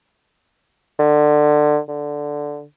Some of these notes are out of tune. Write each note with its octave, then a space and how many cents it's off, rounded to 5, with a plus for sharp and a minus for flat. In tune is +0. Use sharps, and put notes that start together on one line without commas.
D3 +25
D3 -5